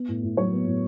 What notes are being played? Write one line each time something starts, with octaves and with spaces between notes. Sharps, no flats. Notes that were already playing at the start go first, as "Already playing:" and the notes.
Already playing: B3
A2
A2
F#3 C#5
B3
A2